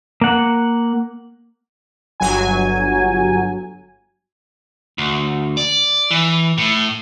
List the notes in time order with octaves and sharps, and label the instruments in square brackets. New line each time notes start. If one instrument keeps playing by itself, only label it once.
[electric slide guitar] A#3 F#5
[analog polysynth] G1 F#3 G#5
[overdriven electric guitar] D2
D5
E3
A2